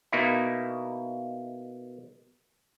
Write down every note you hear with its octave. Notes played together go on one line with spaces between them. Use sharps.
B2 A#3 D#4 E4